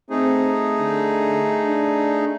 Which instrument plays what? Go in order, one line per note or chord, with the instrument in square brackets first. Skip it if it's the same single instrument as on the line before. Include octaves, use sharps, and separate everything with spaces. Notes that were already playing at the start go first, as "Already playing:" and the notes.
[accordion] A3 D#4 G#4 [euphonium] C4
[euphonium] D3
D4